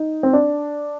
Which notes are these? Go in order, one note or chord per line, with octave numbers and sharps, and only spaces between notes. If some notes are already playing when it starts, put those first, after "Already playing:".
Already playing: D#4
C4
D4